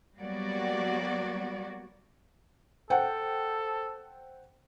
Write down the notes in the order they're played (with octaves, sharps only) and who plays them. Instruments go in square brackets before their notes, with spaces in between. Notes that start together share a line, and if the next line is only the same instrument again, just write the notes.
[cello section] F#3 G3 A#3 B3 F#4 D5
[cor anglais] A4 [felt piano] C5 F#5 G5